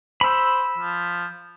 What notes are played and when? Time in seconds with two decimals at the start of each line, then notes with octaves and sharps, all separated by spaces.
0.21 C5 B5 E6
0.78 F3